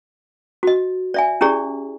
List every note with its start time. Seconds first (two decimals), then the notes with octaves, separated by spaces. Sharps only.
0.63 F#4 D#5
1.14 D5 E5 G#5
1.41 C#4 E4 G4 G#4 D5